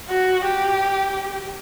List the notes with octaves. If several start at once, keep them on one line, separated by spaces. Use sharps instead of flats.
F#4
G4